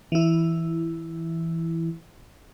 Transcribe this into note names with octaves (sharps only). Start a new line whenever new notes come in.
E3 E4